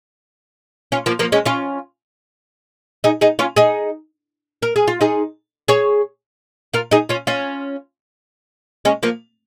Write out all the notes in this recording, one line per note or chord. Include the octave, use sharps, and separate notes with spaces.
C#4 F4
F3 A#3
F3 A#3
G#3 C#4
C#4 F4
D#4 G#4
D#4 G#4
C#4 F4
D#4 G#4
A#4
G#4
F4
D#4 G#4
G#4 C#5
F4 A#4
D#4 G#4
C#4 F4
C#4 F4
G#3 C#4
F3 A#3